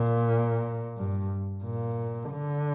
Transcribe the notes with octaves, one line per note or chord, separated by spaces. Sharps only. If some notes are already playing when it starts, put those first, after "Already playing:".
Already playing: A#2
G2
A#2
D3